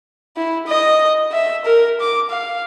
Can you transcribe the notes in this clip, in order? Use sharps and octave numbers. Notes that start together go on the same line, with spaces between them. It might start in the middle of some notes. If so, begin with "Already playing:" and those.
E4
D#5
E5
A#4
D6
F5